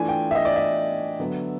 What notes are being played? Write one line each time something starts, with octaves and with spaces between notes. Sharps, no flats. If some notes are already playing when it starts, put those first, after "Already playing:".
Already playing: E3 A3 D4 F4 G#5
G5
E5
D#5
D5
E5
D3 F#3 B3